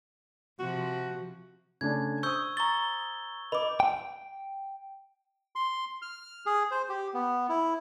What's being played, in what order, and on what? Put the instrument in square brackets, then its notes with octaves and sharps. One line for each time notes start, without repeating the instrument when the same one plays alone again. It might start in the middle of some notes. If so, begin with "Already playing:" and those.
[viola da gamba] C3 F3 [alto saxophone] F#4
[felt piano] C#3 A3 D4 [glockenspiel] G#6
[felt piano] C5 D#6 [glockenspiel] C#6 E6 G6
[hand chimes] A#5 C#6 A6 [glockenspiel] G7
[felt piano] B4 [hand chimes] D#5 D6 [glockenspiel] B5
[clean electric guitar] G5
[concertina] C6
F6
G#4
C5
G4
B3
E4